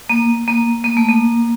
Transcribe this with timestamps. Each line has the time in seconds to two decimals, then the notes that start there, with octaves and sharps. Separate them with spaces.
0.10 A#3
0.48 A#3
0.84 A#3
0.97 A3
1.09 A#3